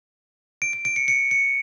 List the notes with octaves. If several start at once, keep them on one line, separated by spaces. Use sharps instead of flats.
D7
D7
D7
C#7
C#7
C#7